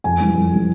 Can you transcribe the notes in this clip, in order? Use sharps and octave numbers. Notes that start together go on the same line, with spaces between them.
F2 G#5
E3 G3
F2
E3 G3